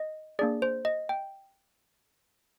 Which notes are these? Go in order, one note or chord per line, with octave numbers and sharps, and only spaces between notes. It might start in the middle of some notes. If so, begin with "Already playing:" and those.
Already playing: D#5
A#3 D4 G#4 D5
C5
D#5
G5